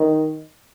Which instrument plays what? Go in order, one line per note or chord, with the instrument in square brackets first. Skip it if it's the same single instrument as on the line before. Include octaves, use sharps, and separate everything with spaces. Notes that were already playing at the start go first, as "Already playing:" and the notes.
Already playing: [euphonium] D#3